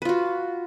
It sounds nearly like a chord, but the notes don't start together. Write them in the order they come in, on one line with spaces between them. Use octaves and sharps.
B4 F4 F#4